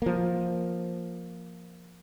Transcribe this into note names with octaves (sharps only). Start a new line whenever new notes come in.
F3 A#3